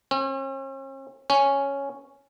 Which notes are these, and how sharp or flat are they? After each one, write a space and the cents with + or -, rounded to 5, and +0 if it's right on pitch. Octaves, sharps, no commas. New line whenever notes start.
C#4 -45
C#4 +0